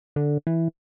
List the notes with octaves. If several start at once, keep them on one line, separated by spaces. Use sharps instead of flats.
D3
E3